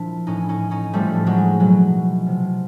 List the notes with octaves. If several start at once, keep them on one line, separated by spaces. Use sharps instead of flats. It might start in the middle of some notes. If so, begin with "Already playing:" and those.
Already playing: A#2 F3 D4 E4
A2 E3 C#4 D#4
C#4 D#4
C#4 D#4
A2 F3 G3 A3
F#3 G#3
B2 F#3
C3 F3